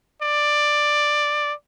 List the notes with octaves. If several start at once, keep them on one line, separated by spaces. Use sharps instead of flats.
D5